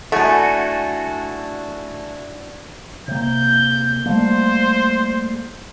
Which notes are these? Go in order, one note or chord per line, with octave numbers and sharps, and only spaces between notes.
A3 D4 E4 F#4 A4 F#5 G#5
C3 A#3 G6
G3 A3 A#3 C5